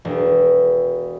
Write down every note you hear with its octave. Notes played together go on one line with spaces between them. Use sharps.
E1